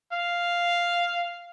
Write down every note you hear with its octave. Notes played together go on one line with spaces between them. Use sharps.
F5